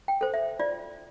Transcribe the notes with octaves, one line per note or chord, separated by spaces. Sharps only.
G5
A4 C5
E5
F4 D5